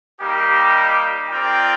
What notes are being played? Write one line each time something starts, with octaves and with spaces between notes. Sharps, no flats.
G3 A#3 D#4 G4
C4 F4 A#4 D5 G5